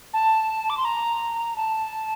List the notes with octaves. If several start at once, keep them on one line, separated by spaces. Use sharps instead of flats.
A5
D6
C6
A#5
A5